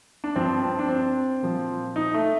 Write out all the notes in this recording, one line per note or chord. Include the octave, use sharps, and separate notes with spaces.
D4
G2 F3 C4
C4
D4
C4
A#2 F3
D#4
A3